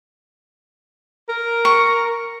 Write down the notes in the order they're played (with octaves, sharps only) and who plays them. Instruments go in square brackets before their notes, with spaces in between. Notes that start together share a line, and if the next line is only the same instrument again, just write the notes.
[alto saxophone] A#4
[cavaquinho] C#6